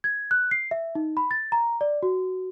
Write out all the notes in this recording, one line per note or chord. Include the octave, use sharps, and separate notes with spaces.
G#6
F#6
C7
E5
D#4
B5
A6
A#5
D5
F#4